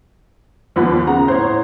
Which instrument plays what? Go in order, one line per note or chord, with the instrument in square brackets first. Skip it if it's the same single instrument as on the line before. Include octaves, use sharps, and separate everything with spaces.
[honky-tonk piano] D#2 F3 B3
[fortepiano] C#3 F#5 [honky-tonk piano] A#5
[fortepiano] A2 [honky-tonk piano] C5 C#5